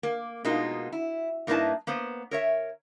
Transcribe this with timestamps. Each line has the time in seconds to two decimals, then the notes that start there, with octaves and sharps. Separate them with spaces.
0.03 A#3
0.45 B2 G#3 A#3 D#4 F4
0.92 E4
1.47 G2 A#3 D#4 E4 B4 A5
1.87 A#3 B3 C5
2.31 A#4 C#5 E5